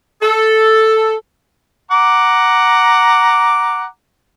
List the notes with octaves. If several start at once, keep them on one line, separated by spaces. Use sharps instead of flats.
A4
F#5 A#5 D6